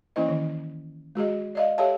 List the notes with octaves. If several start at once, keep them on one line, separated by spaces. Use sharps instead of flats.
E3 A#3 C#4 E4 C5 D#5
D#3
G#3 F#4 G#4 D#5
D5 D#5 F5
G4 A4 C#5 E5 F5 A5